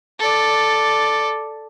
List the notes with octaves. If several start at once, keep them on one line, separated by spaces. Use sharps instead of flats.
A4 D5